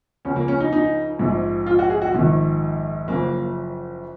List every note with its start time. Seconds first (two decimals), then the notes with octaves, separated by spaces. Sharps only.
0.25 C#2 C#3 F3 C#4
0.36 A#3
0.48 C#4
0.60 D#4
0.73 D#4
1.19 A#1 G#2 F3
1.66 F4
1.79 F#4
1.90 G#4
2.02 F#4
2.14 A#1 G#2 D#3
3.08 F#1 F#2 C#3 F3 A#3